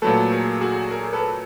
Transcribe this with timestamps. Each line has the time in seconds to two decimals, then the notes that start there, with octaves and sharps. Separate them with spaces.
0.02 A#2 F#3 A3 A4 B4
0.31 G#4 A#4
0.61 F#4 G#4
0.91 G#4 A#4
1.13 A4 B4